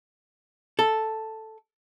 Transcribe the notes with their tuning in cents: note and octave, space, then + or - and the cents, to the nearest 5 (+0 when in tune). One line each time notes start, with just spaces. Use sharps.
A4 +0